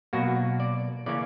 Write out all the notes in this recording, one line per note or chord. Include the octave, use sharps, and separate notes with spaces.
B2 F#3 A#3 F#4
D5
C#3 E3 A#3 C#4 D5